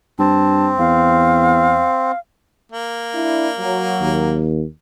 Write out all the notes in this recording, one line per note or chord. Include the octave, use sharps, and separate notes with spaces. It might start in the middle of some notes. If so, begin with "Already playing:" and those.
G2 C4 A5
E2 F5
A#3
D4 E4
F#3
D#2